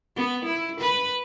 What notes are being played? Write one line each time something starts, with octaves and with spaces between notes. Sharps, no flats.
B3
E4
B4